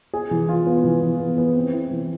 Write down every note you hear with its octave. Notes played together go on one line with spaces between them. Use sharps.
G#4
E3
F4
B3
E3
E3
B3
B3
C4
E4
E3